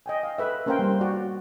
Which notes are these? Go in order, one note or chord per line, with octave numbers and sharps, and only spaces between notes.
D#5 G5 G#5
F5
A4 B4 E5
A#3 C#4 A#4 C5 F5 G5
G3 C#4
F#4 D5